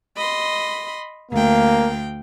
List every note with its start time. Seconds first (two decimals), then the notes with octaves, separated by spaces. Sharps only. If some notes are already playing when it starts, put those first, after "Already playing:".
0.16 D#5 B5 C6
1.31 D2 A#3 F5 G5